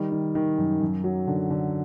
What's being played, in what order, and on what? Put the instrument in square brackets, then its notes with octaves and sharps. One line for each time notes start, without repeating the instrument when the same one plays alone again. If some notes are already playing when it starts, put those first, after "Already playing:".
Already playing: [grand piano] D#3 G3
D#3
D#3
F#2
F#2
F#3
D3
D3